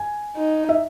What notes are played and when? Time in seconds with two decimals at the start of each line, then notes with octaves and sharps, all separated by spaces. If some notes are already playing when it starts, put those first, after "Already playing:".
Already playing: G#5
0.36 D#4
0.69 E5